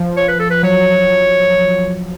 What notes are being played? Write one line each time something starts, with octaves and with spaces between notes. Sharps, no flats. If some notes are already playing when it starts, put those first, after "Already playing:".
Already playing: F3
C#5
B4
A4
B4
F#3 C#5